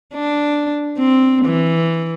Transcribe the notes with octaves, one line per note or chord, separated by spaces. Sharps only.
D4
C4
E3